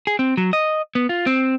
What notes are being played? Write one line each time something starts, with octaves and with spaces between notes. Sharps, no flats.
G#4
C4
F#3
D#5
B3
F4
C4